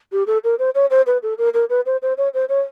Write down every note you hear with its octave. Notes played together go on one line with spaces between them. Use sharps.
G4
A4
A#4
C5
C#5
C5
B4
A4
A#4
A#4
B4
C5
C5
C#5
C5
C#5